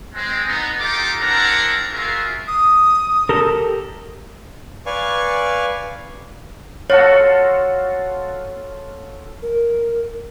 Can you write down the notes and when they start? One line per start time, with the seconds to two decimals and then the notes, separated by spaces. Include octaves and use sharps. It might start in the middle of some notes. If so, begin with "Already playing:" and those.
0.14 G#3 C4
0.46 B3 D#4
0.79 D#4 F4 G4 A4 A#5 D6
1.19 C4 D4 E4 A#4 F#5 A#5
1.91 F4 F#4 G#4 A#4 E5
2.48 D#6
3.29 G4 A4 A#4
4.86 B4 D5 F5 G#5 C#6
6.90 F4 F#4 A4 C#5
9.42 A#4